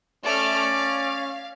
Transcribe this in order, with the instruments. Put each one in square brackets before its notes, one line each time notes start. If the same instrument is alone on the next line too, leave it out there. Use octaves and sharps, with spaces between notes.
[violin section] A3 F6 [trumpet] C#4 [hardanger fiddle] D5
[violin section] F5